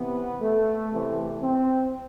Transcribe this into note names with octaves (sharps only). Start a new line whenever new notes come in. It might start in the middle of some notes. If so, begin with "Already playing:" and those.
Already playing: C3 E3 B3
A3
E2 C3 E3 A3
C4